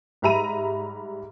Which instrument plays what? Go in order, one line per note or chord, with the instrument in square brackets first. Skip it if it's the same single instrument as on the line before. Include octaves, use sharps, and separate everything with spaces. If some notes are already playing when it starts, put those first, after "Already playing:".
[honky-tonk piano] G#2 G3 E5 A#5 B5 D#7